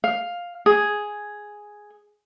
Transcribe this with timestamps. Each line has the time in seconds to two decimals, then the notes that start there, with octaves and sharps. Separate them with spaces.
0.04 F5
0.66 G#4